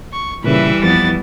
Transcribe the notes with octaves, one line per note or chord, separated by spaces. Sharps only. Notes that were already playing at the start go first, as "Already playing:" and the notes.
C#6
A#2 C#3 E3 G3 B4 E5
F2 F3 B3 A6